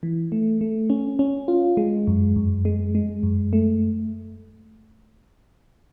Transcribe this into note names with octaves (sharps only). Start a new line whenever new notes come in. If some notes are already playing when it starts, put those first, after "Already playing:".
E3
A3
A3
C#4
C#4
F4
G#3
F#2
F#2
G#3
G#3
F#2
A3